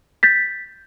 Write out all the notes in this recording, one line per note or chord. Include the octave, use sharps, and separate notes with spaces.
G6 A6 B6